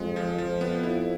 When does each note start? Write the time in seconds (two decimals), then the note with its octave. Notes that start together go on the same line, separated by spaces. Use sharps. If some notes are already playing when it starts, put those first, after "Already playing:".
Already playing: F2 G#3
0.16 F3
0.38 F3
0.61 B3
0.83 E4